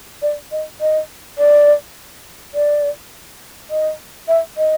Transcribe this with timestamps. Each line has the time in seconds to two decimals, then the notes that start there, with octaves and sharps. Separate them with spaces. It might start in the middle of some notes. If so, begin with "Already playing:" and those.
0.22 D5
0.52 D#5
0.81 D#5
1.38 D5
2.54 D5
3.70 D#5
4.28 E5
4.57 D#5